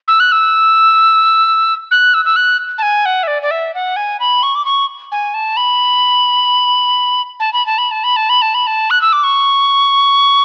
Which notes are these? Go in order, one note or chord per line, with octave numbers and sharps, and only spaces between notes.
E6
F#6
E6
F#6
E6
E6
F#6
A5
G#5
F#5
E5
D5
D5
E5
F#5
G#5
B5
C#6
D6
C#6
G#5
A5
B5
A5
B5
A5
B5
A5
B5
A5
B5
A5
B5
A5
F#6
E6
D6
C#6